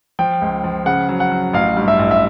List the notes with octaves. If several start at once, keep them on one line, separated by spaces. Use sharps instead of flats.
F3 G5
C#2
F3
C#3 F#5
F#3
F#5
F#3
A1 F5
G2
E5
A1
E5